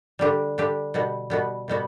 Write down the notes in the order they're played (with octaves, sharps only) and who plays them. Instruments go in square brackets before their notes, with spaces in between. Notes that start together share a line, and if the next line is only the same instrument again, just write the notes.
[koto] D3 G3 D4 G4
D3 G3 D4 G4
B2 G3 B3 F#4
B2 G3 B3 F#4
B2 G3 B3 F#4